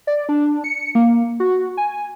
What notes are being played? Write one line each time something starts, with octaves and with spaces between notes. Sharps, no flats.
D5
D4
C#7
A#3
F#4
G#5